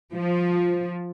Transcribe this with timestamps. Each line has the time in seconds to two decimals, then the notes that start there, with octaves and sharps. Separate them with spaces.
0.13 F3